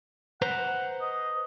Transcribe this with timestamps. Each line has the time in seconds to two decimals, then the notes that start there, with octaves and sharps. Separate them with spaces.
0.42 B4 C5 F#5 A#5
1.01 D#5